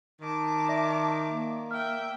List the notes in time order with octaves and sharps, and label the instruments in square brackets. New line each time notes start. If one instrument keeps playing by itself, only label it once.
[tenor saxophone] D#3 [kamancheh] A5 D6
[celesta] D5 E5 A#6
[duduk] A#3
[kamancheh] E5 G5 [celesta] F6